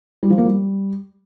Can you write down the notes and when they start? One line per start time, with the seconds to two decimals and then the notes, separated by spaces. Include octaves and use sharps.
0.23 G3
0.30 F3
0.38 A#3
0.45 G3